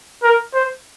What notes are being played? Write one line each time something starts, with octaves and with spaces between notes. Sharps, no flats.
A#4
C5